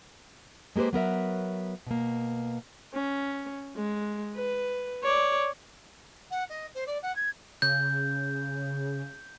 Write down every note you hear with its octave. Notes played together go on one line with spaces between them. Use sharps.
G#3 A#3 G4 B4 C5
F#3 B3 A#4 E5
B2 A#3
C#4
G#3
B4
C#5 D5
F#5
D#5
C5
D5
F#5
G#6
C#3 G6